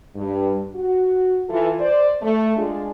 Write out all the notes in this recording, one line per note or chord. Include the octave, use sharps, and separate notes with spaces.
G2
F#4
E3 F4 A4
C5 D5
A3
G#3 D4 F4 G#4